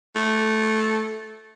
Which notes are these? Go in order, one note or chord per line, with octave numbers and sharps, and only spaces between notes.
A3